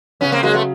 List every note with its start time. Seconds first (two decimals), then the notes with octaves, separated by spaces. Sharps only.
0.21 C#3 B3 C#4
0.32 A#3 C4
0.43 F#3 G#3 A#3
0.54 A3 B3